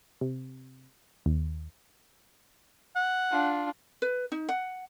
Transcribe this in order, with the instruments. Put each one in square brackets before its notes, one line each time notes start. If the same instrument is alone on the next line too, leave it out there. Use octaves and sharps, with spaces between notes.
[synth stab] C3
D#2
[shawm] F#5
[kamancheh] D4 F4
[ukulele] B4
D#4
F#5